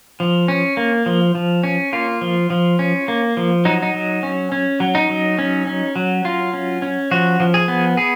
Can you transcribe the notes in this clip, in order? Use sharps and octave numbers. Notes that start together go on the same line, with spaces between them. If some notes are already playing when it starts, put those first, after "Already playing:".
F3
C#4
A#3
F3
F3
C#4
A#3 F4
F3
F3
C#4
A#3
F3
F#3 D#4
D#4
F#3
C#4
C#4
F#3
D#4
F#3
C#4
C#4
F#3
F#3 F4
C#4
C#4
F3 F#4
F3
G#4
B3
B3 G#4